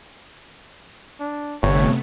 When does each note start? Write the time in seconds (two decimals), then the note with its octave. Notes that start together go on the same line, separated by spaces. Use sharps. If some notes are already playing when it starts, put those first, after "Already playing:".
1.20 D4
1.63 G1 C3 A3 B3 C#5